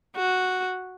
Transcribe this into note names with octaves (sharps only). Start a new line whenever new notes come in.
F#4